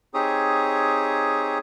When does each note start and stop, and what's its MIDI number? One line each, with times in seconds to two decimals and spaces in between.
0.14 1.58 60
0.14 1.58 63
0.14 1.58 67
0.14 1.58 68
0.14 1.58 73
0.14 1.58 87